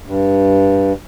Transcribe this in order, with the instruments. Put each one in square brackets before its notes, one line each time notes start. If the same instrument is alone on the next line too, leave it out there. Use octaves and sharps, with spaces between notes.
[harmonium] G2